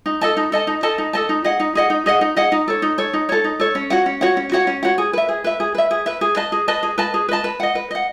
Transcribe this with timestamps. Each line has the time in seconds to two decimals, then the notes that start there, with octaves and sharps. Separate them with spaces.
0.06 D#4
0.21 A4 D#5 A5
0.37 D#4
0.52 A4 D#5 A5
0.67 D#4
0.83 A4 D#5 A5
0.98 D#4
1.13 A4 D#5 A5
1.29 D#4
1.44 G#4 D#5 F#5
1.60 D#4
1.75 G#4 D#5 F#5
1.90 D#4
2.06 G#4 D#5 F#5
2.21 D#4
2.36 G#4 D#5 F#5
2.52 D#4
2.68 A4 C#5
2.82 D#4
2.98 A4 C#5
3.13 D#4
3.29 A4 C#5
3.44 D#4
3.60 A4 C#5
3.75 C#4
3.90 F#4 C#5 F#5
4.06 C#4
4.21 F#4 C#5 F#5
4.37 C#4
4.52 F#4 C#5 F#5
4.67 C#4
4.83 F#4 C#5 F#5
4.98 G#4
5.13 B4 E5
5.29 G#4
5.44 B4 E5
5.60 G#4
5.75 B4 E5
5.91 G#4
6.06 B4 E5
6.21 G#4
6.36 B4 D#5 A5
6.52 G#4
6.68 B4 D#5 A5
6.83 G#4
6.98 B4 D#5 A5
7.14 G#4
7.28 B4 D#5 A5
7.44 B4
7.60 D#5 F#5
7.75 B4
7.91 D#5 F#5